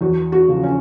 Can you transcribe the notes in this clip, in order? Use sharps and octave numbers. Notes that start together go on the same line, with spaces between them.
E2 F#4
F#4
C#3 F3
C#4